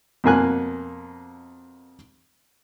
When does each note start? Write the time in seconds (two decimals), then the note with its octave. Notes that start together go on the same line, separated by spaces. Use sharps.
0.24 F2 B2 A#3 G#5 F#6